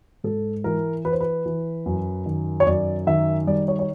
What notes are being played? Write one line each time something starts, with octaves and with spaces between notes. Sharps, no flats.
G#2 A4
E3 A#4
E3 B4
C5
B4
E3
F#2
D#3
C#5
F#2 D5
D#3 E5
G3 D5
C#5
C#5